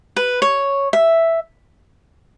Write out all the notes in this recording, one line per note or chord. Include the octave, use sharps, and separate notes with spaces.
B4
C#5
E5